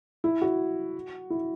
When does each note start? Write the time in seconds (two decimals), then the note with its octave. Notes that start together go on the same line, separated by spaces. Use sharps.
0.24 E4
0.42 F#4
1.30 E4